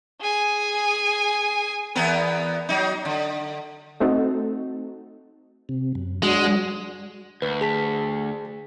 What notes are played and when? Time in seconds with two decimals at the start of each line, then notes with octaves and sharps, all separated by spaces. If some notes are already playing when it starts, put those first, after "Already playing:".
0.21 G#4 G#5
1.95 E2 B3 A#4
2.69 F#3 D#4
3.05 D3
4.00 A3 C4 D#4 F#4 A4
5.69 C3
5.95 F#2
6.23 F#3 G#3 D4 F#4
7.42 D2 B4
7.61 G#4 A5 B6